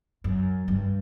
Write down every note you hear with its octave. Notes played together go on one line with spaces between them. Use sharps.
F#2
G2